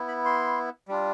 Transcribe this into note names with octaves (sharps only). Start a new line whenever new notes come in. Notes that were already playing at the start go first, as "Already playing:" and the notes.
Already playing: B3 E4
B5
C6
G3 D4 F4